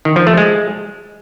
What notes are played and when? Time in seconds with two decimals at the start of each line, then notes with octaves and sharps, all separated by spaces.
0.05 D#3
0.16 F3
0.27 A3
0.37 G#3